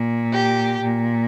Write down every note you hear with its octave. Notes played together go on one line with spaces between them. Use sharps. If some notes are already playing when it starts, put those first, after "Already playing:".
Already playing: A#2
G4
A#2